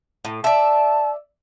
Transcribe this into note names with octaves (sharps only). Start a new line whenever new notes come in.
A2
D5 E5 A5